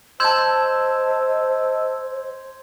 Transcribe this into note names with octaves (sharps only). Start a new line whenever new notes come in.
C5 D#5 A5 C6 E6 G6 G#6